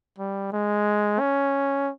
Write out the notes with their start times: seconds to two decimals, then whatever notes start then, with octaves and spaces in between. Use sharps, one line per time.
0.19 G3
0.52 G#3
1.20 C#4